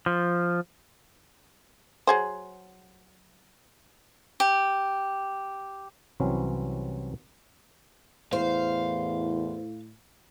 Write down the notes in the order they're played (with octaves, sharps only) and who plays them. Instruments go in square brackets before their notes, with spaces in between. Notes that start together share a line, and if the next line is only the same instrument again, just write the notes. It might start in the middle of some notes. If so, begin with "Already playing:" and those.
[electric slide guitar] F3
[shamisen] F#3 G#4 C5
[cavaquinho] G4
[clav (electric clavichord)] C2 E3 F#3 C4 C#4
[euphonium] E2 [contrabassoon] A2 [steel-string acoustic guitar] C5 [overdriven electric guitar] F5